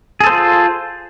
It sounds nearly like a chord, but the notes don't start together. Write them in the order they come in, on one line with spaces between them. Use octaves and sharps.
G#4 A4 C5 F4